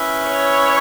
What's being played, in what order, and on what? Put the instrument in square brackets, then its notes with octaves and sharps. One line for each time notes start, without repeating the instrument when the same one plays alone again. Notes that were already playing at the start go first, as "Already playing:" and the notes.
Already playing: [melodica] C#4 E4 B4 E5
[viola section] C#5